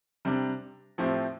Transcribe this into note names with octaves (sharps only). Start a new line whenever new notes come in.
C3 G3 D4
A2 F3 C4 E4 G4